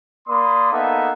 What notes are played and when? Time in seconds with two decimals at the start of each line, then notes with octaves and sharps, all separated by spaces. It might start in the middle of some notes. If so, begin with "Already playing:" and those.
0.28 A#3 D5 B5 C6 D#6
0.72 A#3 B3 D#4 A4 E5 F5